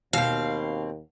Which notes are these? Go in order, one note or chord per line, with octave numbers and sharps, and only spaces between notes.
D#2 B2 C4 F5